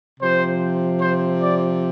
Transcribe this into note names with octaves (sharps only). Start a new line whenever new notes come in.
C3 F3 C5
C5
D5